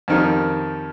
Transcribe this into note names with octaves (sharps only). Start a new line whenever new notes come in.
F2 D#3 G3